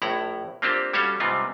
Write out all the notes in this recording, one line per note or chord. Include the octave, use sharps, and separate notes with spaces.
A#1 A2 E4 F#5 A#5
A#3 C4 D4 F4 G4 C5
G3 C#4 F#4 A4 C#5 F5
G#2 C3 G3 B3 C4 F4